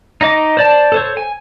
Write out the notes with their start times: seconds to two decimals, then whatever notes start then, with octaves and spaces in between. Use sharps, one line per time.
0.21 D#4 D#5 D6
0.57 C5 D5 A5
0.92 A4 C5 C#5
1.17 G#5